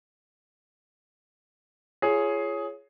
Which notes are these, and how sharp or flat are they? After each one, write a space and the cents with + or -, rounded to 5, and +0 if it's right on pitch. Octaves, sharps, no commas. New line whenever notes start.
F4 -35 G#4 +10 C#5 +0